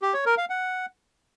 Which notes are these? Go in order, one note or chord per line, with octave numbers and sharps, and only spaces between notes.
G4
C#5
A#4
F5
F#5